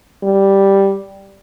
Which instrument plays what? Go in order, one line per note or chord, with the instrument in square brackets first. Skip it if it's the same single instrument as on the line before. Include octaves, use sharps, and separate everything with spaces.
[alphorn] G3